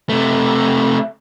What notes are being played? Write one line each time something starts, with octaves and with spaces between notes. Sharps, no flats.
C3 A3